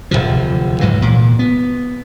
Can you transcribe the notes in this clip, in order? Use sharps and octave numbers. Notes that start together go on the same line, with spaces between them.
D1 C2 C3 F3
C#2 G#2 E3 F#3
A#2
B3